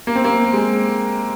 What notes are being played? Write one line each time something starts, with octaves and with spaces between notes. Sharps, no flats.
A#3
C4
A#3
G#3